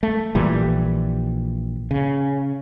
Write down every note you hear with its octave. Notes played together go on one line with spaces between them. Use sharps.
A3
A#1 A#2 E3 G3
C#3